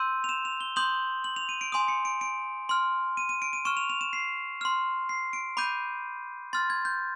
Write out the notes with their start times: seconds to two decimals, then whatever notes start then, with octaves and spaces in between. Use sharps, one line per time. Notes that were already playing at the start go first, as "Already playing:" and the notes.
Already playing: C6 E6 G6 D#7
0.24 F7
0.29 E7
0.45 F7
0.61 G7
0.76 C6 D#6 G6 F#7
1.24 F#7
1.36 F7
1.49 D#7
1.61 D7
1.72 G#5 C6 D#6 D7
1.88 C#7
2.05 D7
2.21 D7
2.69 C6 F6
3.17 D#7
3.29 D#7
3.42 D7
3.53 D#7
3.65 C#6 F6 E7
3.77 F7
3.90 F7
4.01 E7
4.13 C7
4.61 C6 F6
5.09 C7
5.33 D7
5.57 B5 D6 G6 D#7
6.53 C6 F6 A6
6.70 G#6
6.85 G6